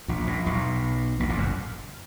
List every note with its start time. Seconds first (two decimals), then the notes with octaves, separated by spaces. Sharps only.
0.08 A#1 A#2
0.27 A#1 A#2
0.46 B1 B2
1.20 A#1 A#2
1.29 A1 A2
1.38 F#1 F#2